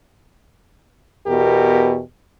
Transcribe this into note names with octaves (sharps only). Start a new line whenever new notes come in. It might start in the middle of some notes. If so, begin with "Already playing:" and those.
E2 B2 G4 A#4